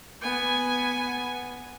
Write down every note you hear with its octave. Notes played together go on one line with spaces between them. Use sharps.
B3 G#5